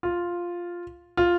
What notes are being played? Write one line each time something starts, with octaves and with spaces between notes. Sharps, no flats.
F4
F4